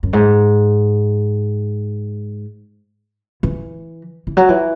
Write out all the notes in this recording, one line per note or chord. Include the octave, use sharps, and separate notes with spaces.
F#2
G#2
E3
E3
F#3
E3